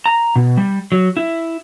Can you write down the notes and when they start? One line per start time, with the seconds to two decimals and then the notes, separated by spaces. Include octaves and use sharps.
0.06 A#5
0.36 B2
0.57 G3
0.92 F#3
1.17 E4